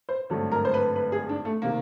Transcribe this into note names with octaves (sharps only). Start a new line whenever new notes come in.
C5
G#1 G2 D3 F#3 A3
A#4
C5
B4
B4
G#4
D4
A3
C3 D#3 A#3